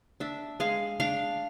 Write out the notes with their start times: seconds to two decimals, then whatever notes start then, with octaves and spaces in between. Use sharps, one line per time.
0.20 D4 E5
0.60 G#3 F5
1.00 D4 F5